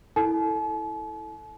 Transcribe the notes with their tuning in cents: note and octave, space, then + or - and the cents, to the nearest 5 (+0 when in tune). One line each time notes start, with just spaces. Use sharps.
E4 -5 A4 +0 A5 -45